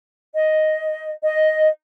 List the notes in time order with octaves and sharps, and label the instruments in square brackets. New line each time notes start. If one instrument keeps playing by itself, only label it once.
[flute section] D#5
D#5